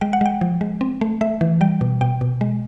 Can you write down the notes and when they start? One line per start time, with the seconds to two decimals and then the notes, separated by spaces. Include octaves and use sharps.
0.01 G#3 G5
0.13 F#5
0.21 G#3 G5
0.41 F3
0.61 G#3
0.81 C4
1.01 A3
1.21 A3 E5
1.41 E3
1.61 G3 G5
1.81 B2
2.01 B2 G5
2.21 B2
2.41 G#3